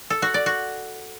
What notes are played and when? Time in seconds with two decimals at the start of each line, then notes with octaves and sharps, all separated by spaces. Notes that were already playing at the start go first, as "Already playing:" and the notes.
0.10 A4
0.22 F#4
0.34 D5
0.46 F#4